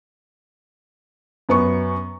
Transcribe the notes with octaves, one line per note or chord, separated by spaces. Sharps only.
F#2 B3 C#6